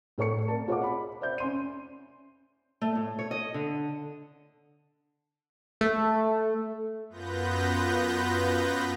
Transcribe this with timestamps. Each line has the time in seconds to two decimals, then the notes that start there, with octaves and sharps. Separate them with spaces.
0.18 A2 A4 C#5 C#6 C#7
0.48 A#4 D5 A5
0.68 F4 G#4 C#5 D#5 F#5 D6
0.84 B5
1.21 C5 D5 E5 G6
1.38 C#4 C6 D#7
2.82 A3
2.95 A2
3.19 C#5
3.31 D#5
3.54 D3
5.81 A3
7.09 F#2 B3 F4 B4 G6 A#6